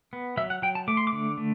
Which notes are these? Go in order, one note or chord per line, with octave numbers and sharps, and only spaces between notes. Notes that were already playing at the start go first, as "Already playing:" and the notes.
B3
F#3 E5
F#5
F#3 G5
A5
A3 D6
C6
D6
D3
A3